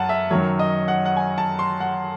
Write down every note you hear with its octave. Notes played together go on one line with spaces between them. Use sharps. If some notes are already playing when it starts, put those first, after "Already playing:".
Already playing: F#2 F#5 A5
E5
F#2 D#3 F#3 C#5
D#5
F#5
F#5
G#5
A5
C6
F#5